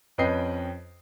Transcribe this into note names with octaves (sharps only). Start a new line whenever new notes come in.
F2 C#4 B4 D#5 G5 C7